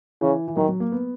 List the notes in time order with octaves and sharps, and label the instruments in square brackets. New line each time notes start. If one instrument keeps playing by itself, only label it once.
[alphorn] C#3 [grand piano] E3
[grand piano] E3
[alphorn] D#3 [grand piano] F#3
[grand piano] F#3
A#3
B3